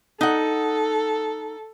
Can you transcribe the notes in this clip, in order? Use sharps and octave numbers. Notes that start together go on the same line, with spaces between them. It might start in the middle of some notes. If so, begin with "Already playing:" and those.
D#4 A4 F#5